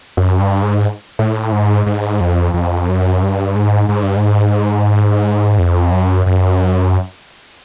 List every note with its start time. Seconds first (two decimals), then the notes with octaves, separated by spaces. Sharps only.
0.17 F#2
0.40 G2
0.63 G#2
1.19 A2
1.52 G#2
1.87 G#2
2.20 F2
2.54 F2
2.88 F#2
3.22 G2
3.56 G#2
3.89 G#2
4.03 G2
4.17 G#2
5.59 F2
5.92 F#2
6.26 F#2